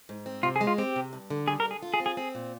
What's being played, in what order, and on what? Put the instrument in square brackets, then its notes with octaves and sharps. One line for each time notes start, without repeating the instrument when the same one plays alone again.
[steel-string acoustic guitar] G#2
C4
[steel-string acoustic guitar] C3 [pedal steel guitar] F4
[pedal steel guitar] G#4
[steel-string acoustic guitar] G#3
[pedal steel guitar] F4
[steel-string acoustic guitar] C4 [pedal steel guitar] G4
[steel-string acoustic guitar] C3
G2
D3
[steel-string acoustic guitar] G3 [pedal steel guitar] G#4
[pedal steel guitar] A#4
[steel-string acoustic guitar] D3
[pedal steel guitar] G#4
[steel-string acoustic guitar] F4
[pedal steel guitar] G#4
[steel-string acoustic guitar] C4
[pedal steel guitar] G#4
[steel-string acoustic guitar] C4 [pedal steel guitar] G#4
[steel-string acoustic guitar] A#2